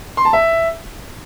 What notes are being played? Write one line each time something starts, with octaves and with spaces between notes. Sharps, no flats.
C6
A5
E5